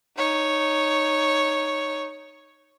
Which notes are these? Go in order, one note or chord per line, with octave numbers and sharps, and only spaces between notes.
D#4 C#5